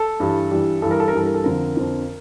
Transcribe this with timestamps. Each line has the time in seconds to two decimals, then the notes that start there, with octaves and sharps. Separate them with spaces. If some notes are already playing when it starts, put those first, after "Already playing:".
Already playing: A4
0.20 G2 E3 G3
0.51 G2 E3 G3
0.82 G2 E3 G3 A4
0.91 A#4
1.00 A4
1.08 A#4
1.13 G2 E3 G3 A4
1.26 A#4
1.34 A4
1.44 F2 D3 F3 A#4
1.76 F2 D3 F3